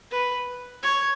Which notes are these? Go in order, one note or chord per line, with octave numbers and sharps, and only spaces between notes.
B4
C#5